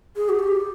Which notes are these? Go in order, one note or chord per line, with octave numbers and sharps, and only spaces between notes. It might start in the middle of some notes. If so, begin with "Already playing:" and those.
G#4
F#4
G4